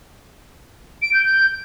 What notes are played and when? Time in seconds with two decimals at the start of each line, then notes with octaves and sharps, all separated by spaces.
1.02 D7
1.13 G6
1.25 G6